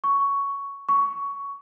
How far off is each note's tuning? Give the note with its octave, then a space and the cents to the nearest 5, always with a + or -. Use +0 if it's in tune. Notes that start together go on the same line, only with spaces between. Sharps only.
C#6 +10
C#6 +15